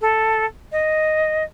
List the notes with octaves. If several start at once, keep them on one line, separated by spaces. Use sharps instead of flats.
A4
D#5